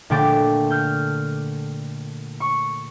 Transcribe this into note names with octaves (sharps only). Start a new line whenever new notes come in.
A#2 D3 A3 G5 D6 A6
F6 G6
C#6